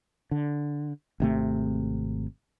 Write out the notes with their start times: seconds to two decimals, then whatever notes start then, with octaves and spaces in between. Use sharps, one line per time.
0.31 D3
1.20 G#1 C3 A3